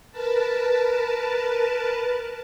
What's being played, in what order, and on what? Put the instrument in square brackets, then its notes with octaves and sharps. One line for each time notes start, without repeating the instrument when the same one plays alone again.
[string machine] A#4 B4 A5